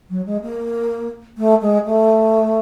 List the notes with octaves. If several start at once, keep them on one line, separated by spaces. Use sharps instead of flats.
F#3
G#3
A#3
A3
G#3
A3